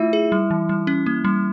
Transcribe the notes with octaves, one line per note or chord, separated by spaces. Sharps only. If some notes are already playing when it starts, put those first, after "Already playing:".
Already playing: A3 E4 F4
G#4
G3
E3
G3
C#4
A#3
G3